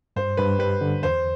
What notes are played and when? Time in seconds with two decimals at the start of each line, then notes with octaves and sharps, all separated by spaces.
0.16 G2 C5
0.37 G2 B4
0.59 G3 B4
0.81 D3
1.02 E2 C5